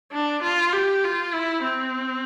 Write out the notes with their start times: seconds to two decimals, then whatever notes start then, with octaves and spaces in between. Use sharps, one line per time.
0.12 D4
0.43 F4
0.73 G4
1.04 F4
1.34 E4
1.63 C4